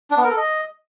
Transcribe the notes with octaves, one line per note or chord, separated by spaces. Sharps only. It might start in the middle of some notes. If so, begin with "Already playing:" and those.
D4
B3
A#4
A4
D#5